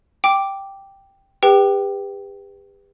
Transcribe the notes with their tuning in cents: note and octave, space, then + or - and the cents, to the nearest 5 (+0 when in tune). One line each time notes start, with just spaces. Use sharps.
G5 +0 D6 +0
G4 +35 B4 +0 G5 -15